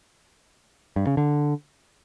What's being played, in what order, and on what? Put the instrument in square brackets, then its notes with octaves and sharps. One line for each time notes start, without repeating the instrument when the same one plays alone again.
[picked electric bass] G2
C#3
D3